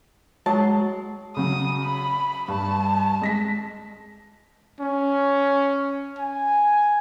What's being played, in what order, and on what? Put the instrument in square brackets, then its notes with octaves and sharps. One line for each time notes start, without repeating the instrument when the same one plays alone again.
[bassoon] F#3 [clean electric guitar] G#3 [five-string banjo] A5
[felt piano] C#3 F#3 [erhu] D#6
[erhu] B5
[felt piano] G2 [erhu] A5
[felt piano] G#3 A#6 B6
[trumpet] C#4
G#5